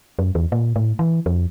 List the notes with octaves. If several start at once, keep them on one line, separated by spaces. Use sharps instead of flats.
F#2
E2
A#2
A2
E3
F2